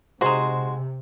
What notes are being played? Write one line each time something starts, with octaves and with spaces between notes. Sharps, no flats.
C3 G#3 D#4 F#4 C5